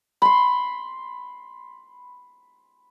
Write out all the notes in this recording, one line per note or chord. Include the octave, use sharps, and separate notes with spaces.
B5 C6